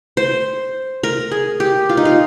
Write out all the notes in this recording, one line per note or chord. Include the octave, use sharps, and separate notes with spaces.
C5
A#4
G#4
G4
F4
D#4
F4